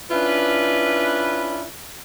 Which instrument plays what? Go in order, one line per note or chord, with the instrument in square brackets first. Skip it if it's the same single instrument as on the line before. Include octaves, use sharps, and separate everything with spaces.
[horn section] C#4 D4 E4 F4 B4